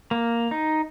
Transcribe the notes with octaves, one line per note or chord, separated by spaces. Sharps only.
A#3
D#4